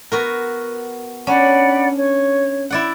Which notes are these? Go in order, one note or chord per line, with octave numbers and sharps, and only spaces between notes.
B3 F#4 A#4
C#4 D4 D5 F#5 B5
C#5
E4 D5 F#5